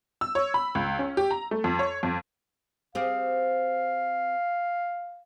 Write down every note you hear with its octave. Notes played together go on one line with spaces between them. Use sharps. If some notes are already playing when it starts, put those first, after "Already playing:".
E6
C#5
B5
C#2
C#4
G4
A#5
A3
F2
C#5
F2
C4 G4 G#4 F5